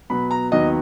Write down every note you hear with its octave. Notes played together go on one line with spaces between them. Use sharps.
B2 F#3 B3 B5
A#5
D#2 D#3 F#3 B3 D#5